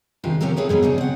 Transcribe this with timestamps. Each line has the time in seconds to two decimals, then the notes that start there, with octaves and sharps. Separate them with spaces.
0.24 G#2 C3 D#3 D4 F4 G4
0.41 C3 F3 C#4 G4 A4 A#4
0.56 G#4 A4 B4 C#5 E5 G5
0.69 G#2 B2 E3 F#3
0.82 C#3 D4 D#4
0.98 C4 F#5